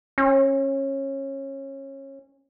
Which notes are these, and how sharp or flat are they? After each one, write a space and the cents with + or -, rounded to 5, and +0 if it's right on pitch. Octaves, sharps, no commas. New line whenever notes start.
C#4 -25